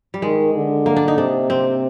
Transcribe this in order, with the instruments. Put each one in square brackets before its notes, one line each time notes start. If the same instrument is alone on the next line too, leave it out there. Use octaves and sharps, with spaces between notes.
[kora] G3
[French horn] D#3 [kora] G#3
[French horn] D3
[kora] A#3
D4
D#4
[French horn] C3 [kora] D4
[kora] C4